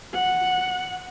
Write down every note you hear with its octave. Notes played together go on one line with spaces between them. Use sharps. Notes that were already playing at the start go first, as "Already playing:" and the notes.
F#5